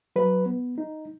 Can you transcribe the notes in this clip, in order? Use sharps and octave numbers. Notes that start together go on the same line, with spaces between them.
F#3 B4
B3
D#4